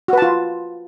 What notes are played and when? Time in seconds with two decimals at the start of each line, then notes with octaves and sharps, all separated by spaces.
0.08 F#4
0.13 B4
0.18 A5
0.22 F4